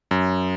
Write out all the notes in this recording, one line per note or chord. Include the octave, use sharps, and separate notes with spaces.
F#2